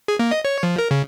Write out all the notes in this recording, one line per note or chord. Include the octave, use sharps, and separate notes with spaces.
G#4
A#3
D#5
C#5
F3
A#4
C#3